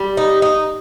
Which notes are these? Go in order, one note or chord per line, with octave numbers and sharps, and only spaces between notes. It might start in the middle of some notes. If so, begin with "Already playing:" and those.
Already playing: G3
D#4
D#4